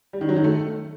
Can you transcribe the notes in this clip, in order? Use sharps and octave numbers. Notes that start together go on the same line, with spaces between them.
G3
D#3
F#3
D#3
A3